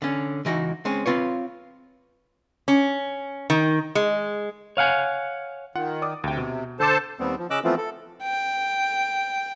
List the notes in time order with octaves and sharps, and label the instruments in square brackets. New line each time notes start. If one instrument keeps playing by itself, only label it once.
[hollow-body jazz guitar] D3 C#4
C#2 E3 D#4 F#4
G#3 C4 C#4
C4 F4 B4 C#5
[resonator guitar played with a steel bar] C#4
D#3
G#3
[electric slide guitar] C#5 F5 F#5 G#5
[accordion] D#3 [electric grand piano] F4 F#5
[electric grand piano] D5 D6 D#6
[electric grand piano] D2 G5 [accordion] C3
[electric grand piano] B2
[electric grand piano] D3 D6 [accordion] A4 C5 A5
[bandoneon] D#2 G3 B3 C4
F3
C#3 C#4 D#5 D6 E6 F#6
E3 F3 A3 B3 C4 F4
A4
[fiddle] G5